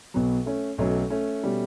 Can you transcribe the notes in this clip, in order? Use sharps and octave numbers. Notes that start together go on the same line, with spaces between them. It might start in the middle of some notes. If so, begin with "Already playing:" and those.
B1 B2 F#3 B3
A3 C#4
B1 B2 F#3 A3 C#4
A3 C#4
B2 G3